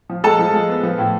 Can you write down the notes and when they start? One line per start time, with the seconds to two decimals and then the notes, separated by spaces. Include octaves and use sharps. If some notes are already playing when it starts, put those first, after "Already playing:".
0.10 F3
0.24 G#3 A4 A5
0.39 F3
0.53 G#3
0.69 B3
0.83 F3
0.98 A2